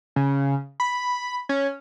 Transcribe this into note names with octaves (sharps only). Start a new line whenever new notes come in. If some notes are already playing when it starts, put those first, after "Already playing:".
C#3
B5
C#4